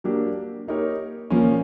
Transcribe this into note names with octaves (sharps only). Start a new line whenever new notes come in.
F#3 A#3 D4 G4
A#3 D#4 G4 A#4 C#5
A#2 F3 A#3 C#4